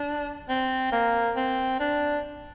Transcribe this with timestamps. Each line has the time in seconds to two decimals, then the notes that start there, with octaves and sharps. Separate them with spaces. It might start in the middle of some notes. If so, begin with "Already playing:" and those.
Already playing: D4
0.49 C4
0.92 A#3
1.36 C4
1.80 D4